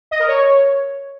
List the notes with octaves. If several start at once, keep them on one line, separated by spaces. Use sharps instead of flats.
D#5
A#4
C#5